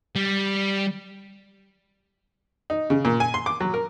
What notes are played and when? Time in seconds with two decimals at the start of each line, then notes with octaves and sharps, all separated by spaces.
0.16 G3
2.70 D#4
2.90 C#3
3.05 A#2
3.20 G#5
3.34 C6
3.46 D6
3.61 F#3
3.74 A#4